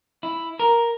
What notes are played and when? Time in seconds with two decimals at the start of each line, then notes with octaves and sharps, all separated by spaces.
0.23 E4
0.59 A#4